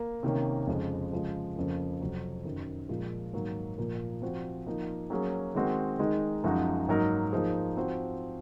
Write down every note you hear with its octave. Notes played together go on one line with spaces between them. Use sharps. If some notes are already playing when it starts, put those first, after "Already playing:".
Already playing: A#3
C3 D#3 A#3 C#4
F2 C#3 G#3
C#3 F3 G#3
F2 C#3 F3 A#3
F2 C3 F#3
F#2 D#3 F#3
A#2 F3 G#3
G#2 D#3 F#3 A#3
A#2 F3 A#3
F3 C4 F#4 C5
F3 A#3 D#4
F#3 A#3 C#4 G#4
D#3 G#3 C4 F#4
D#3 G#3 D#4
F#2 F3 G#3 D#4 F#4
G#2 F#3 A#3 D#4 A#4
F3 A#3 D#4 G#4 C5
F3 C4 F#4 C5